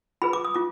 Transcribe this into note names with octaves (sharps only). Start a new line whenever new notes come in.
F4 G#4 B4 B5
D6
D#6
F4 D6